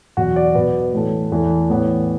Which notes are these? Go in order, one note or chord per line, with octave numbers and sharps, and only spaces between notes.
E2 B2 F#3 F#4
D5
B2 B3 B4
A2 E3 A3
E2 E3 A3
A2 E3 B3